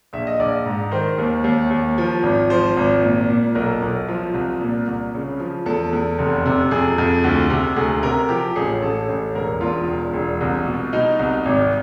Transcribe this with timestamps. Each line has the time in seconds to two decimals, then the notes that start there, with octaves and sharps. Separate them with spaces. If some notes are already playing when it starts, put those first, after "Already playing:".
0.13 A#1 E5
0.27 D#5
0.39 A#1 D5
0.65 G#2
0.91 D#3 C5
1.18 D#2
1.44 D#2
1.70 D#2
1.98 F3
2.23 G#1
2.50 F3 C5
2.77 G#1
3.02 A#2
3.30 A#2
3.55 B1 A#4
3.82 B1
4.08 F3
4.34 C2
4.61 A#2
4.87 C2
5.14 C#3
5.40 F3
5.66 E2 A4
5.93 E2
6.19 F1
6.46 C3
6.71 F2 G#4
6.98 F2
7.24 D2
7.50 C3
7.76 D2 G#4
8.03 C3 A#4
8.29 F3 G4
8.56 A1 G#4
8.82 A1 A4
9.08 A1
9.35 E1 A#4
9.61 E2 F4
9.87 E1
10.13 E1
10.41 C2
10.66 B2
10.93 B2 D#4
11.19 C2
11.45 G#1